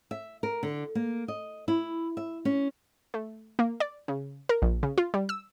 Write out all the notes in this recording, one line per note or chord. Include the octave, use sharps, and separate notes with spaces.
E5
A#4
D3
A#3
D#5
E4
E5
C#4
A3
A#3
D5
C#3
A#4
A#1
C#3
F4
G3
E6